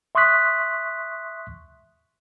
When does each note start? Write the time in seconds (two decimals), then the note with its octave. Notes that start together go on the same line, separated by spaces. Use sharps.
0.15 E5 C6 C#6 D#6 F#6 B6